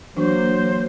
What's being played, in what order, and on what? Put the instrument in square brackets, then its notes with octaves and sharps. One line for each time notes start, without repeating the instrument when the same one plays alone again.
[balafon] E3 D4 [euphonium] F#3 [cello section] A#3 [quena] C5